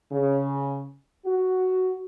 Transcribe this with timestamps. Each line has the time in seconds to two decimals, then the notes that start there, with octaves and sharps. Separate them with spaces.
0.13 C#3
1.26 F#4